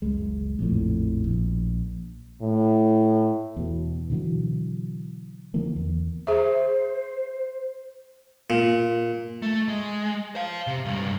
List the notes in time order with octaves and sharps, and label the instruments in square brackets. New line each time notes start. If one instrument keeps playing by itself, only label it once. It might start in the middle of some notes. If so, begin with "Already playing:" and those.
[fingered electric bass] F#1 C#2 G#3
A#1 F2 A2
A#1
[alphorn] A2
[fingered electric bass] E2 B2
B2 D3 E3 F#3
D3 D#3 F3 A#3
E2
[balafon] G#4 E5 [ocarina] C5
[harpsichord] A#2
[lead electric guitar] A3
G#3
C5 F5
C3
C#2 G2